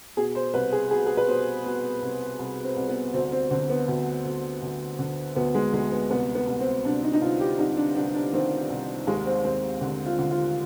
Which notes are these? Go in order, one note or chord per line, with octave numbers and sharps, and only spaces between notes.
B2 G#4
C5
C2 B4
G#4
B2 G#4
G#4
B4
B2 C5
B2
C2
C2
C4
C2
B3
D2 C4
C4
D3 C4
B3
D2
D2
D2
D3
D2 B3
G#3
D2 G#3
B3
C2 B3
B3
C2
C4
C2 D4
D#4
D#4
C2 F4
G4
C2 D#4
D4
C2 D4
D4
D#3 C4
C2
D#2 G#3
C4
D#2 C4
D3
F4
D3
F4